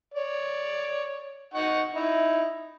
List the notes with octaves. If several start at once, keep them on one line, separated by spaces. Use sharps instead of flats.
C#5 D5
D#4 F#5 C#6
D#4 E4